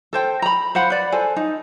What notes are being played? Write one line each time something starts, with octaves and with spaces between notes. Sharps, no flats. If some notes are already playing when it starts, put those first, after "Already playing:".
A4 C5 G5
A#5 B5
C5 F5 F#5 B5
B4 D5
A4 C5 G#5
D#4